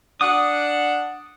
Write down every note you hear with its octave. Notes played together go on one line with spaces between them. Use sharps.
D4 F#5 D6 D#6